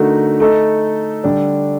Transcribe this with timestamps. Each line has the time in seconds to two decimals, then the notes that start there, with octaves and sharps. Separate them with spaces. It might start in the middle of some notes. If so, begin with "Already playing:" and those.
Already playing: D3 A3 D#4 F#4 A#4
0.40 A3 D#4 A4 D#5
1.24 D3 G3 D4